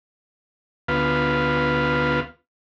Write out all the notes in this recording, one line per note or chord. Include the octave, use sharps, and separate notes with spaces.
D2 B3 F4 B4 F5 C6